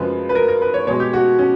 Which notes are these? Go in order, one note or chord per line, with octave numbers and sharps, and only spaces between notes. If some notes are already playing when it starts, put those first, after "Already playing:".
Already playing: F#2 C#3 F3 G#3 B4
B4
A#4
A#4
B4
C#5
B2 G#3 C#5
G4
F#4
C#4